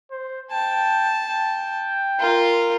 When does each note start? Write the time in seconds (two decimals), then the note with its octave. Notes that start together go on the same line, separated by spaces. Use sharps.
0.12 C5
0.51 G5 A5
1.27 G5
2.19 F4 A#4